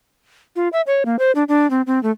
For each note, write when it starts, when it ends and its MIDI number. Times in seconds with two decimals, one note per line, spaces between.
0.56 0.68 65
0.73 0.81 76
0.87 1.03 73
1.05 1.16 58
1.19 1.32 72
1.35 1.44 62
1.49 1.69 62
1.70 1.82 60
1.87 2.01 60
2.03 2.11 57